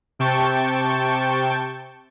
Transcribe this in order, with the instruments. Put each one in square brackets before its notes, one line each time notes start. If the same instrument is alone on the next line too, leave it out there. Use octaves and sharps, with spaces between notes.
[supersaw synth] C3 G5 A5 C#6 G6